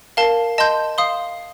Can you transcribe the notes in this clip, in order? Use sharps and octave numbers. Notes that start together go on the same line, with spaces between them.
A#4 F5 A5
D#5 A5 C6 G6
F5 C6 D#6